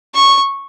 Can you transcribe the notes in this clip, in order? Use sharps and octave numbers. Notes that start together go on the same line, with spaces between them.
C#6